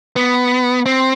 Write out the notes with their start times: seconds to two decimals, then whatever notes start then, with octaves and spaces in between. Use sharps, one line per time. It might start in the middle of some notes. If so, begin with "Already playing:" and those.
0.16 B3
0.86 C4